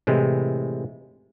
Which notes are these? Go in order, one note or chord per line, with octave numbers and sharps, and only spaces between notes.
A2 C3 E3 G#3